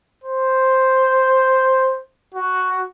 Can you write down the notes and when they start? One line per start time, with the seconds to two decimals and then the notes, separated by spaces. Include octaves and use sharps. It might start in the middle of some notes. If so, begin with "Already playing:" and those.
0.24 C5
2.34 F#4